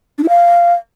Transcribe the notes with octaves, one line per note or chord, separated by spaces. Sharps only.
D4
E4
F5